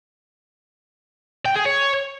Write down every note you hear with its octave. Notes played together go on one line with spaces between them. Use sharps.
G5
G#4
C#5